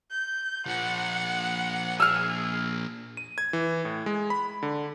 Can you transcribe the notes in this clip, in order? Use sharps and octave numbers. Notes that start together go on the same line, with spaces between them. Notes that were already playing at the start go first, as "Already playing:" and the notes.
G6
A#2 F3 F#5
G#4 E6 F6
D#7
G#6
E3
A2
G#3
B5
D3